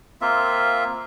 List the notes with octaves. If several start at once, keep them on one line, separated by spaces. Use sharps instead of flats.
A#3 C4 F4 E5